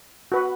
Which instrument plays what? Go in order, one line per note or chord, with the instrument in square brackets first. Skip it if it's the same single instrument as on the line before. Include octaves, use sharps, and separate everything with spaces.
[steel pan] F#4 B4